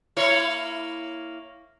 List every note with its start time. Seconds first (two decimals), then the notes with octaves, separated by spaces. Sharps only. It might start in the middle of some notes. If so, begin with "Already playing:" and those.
0.17 A#3 E4 C#5